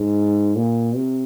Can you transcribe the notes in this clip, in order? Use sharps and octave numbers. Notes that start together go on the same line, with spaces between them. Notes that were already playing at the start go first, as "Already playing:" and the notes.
Already playing: G#2
A#2
C3